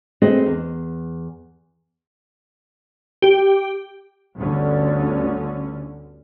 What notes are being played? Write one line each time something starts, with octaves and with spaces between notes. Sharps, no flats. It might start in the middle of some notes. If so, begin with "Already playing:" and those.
A3 C4 G#4 B4 D#5
E2
G4
G1 D2 D3 C#4